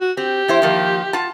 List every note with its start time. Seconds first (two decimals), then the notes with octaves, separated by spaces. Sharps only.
0.01 F#4
0.17 C4 G4
0.48 E2 E4 C5
0.62 D#3 F3 A#3
1.13 F4 F#5 A5